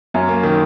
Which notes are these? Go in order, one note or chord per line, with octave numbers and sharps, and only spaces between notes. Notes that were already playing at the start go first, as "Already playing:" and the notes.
F#2 C#4
A#3
D#3